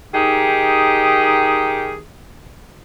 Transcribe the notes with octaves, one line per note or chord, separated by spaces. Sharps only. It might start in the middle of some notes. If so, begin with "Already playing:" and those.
D#3 D#4 G4 G#4